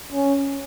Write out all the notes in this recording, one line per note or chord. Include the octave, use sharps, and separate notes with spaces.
C#4